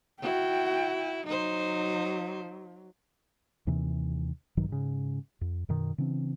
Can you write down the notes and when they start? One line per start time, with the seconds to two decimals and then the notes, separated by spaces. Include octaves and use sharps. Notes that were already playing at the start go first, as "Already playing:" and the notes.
0.22 E4 F#4 G5
1.26 F#3 D#4 C5
3.67 D#2 C3 E3
4.57 A#1 G2 D#3 F#3
4.68 G#2 C#3
5.41 F2
5.69 F#2 B2 D#3
5.98 C#3 E3 C4 D4